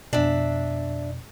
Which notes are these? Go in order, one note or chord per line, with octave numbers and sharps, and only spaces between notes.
F2 B2 D4 E5